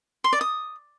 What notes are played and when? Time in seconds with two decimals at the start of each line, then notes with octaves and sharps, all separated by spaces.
0.24 C6
0.33 D5
0.41 D#6